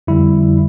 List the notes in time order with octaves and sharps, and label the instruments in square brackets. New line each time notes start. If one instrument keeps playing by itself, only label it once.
[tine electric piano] F2 D3 G3 E4